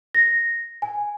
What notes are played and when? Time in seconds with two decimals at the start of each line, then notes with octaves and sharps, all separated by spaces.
0.15 A#6
0.82 G#5